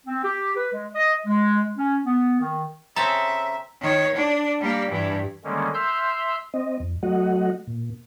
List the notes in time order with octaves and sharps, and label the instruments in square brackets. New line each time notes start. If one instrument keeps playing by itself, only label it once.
[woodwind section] C4
G4
B4
G#3
D#5
G#3
C#4
B3
D#3
[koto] C#3 C4 A4 [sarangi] E5 [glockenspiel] A#5
[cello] D#3 C#5
D4
G3 A#3
G2 E3
[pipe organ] D3 D#3 G3 G#3 A#3 C#4
E5 C6 E6 F6 G6
[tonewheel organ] C4 D#5
F2
F#3 A3 F#4 D#5 F#5
A#2